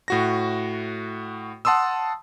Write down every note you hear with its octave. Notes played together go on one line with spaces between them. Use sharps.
A2 F#4 A#6
F#5 A5 C6 D#6 E6